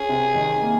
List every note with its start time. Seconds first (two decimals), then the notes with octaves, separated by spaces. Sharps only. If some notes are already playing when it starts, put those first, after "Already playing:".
Already playing: C#4 G#4
0.09 C3
0.35 D#3
0.62 A#3